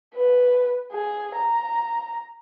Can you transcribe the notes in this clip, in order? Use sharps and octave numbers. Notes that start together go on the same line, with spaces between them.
B4
G#4
A#5